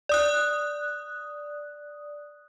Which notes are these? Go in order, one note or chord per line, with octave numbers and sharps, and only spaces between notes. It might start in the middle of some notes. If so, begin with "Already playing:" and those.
D5 D#6 F#6